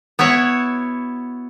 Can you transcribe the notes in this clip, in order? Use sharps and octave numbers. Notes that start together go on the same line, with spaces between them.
B3 E4 F#4 C#5